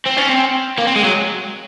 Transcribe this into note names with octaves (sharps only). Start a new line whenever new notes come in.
C4
C#4
C4
A#3
C4
G#3
F#3